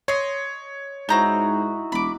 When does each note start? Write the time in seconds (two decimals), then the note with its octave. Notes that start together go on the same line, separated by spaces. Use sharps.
0.08 C#5 D#5 C6
1.09 G#2 C4 D#4 E4 F#4 A#5 G6
1.92 E1 B5 D6